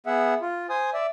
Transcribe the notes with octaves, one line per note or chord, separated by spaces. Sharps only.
B3 G#4 E5 F#5
F4
C5 G#5 D#6
D5 E5